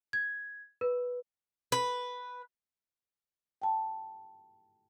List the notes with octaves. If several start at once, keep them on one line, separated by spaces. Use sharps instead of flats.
G#6
B4
B4
G5 A5